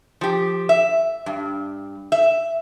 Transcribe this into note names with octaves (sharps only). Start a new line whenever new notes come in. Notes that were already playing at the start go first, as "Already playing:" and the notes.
F3 G4
E5
G2
E5